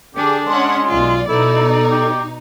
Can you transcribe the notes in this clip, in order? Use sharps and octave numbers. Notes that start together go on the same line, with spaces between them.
D3 D4 G4 G#4
G#3 C#4 F#5 C6
B1 F4 D5
B2 D#4 E4 A4 D5
G4